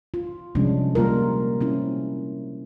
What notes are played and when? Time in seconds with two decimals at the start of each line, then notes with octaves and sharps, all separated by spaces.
0.14 F4
0.55 C3 F3 G3 G#3 C#4 D4
0.95 G3 A#3 F4 A#4
1.61 C4 C#4 E4